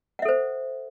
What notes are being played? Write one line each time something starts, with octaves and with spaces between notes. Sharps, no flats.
A4 C5 E5 F#5